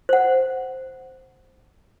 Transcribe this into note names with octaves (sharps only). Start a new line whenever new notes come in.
C5 F#5